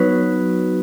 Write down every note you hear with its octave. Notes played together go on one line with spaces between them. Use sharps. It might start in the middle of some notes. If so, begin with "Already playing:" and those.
Already playing: F#3 B3 D#4 F#4 B4